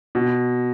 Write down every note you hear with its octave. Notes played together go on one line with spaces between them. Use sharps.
B2